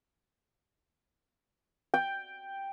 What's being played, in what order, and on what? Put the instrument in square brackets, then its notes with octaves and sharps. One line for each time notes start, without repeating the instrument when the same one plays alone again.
[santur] G5